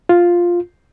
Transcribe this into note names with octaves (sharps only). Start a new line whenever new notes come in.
F4